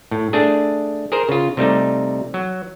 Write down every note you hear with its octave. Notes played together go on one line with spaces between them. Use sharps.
A2
A3 D4 G#4
G#4 A#4 C5
C#3 F4
C3 G3 A3 D#4
F#3